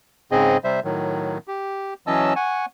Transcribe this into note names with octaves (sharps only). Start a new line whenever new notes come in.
G#2 C#3 C4 G#4 D#5
C3 G3 C5 E5
A2 D#3 F#3
G4
E3 F#3 C#4 D#5 A5 E6
F#5 G#5 C#6